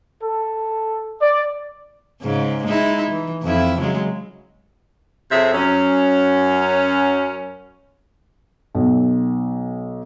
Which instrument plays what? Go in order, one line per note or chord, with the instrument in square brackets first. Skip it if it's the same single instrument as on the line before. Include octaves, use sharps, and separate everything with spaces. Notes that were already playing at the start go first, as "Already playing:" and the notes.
[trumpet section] A4
D5
[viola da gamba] G#2 C#3
G#3 D#4 E4
E3
F2 E4
C#3 F#3 G#3
[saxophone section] F2 C3 G#4 C#5 E5
F#2 C#4
[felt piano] B1